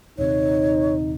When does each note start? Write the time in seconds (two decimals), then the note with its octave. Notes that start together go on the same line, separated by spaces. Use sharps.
0.18 D#1 C3 D#4 C#5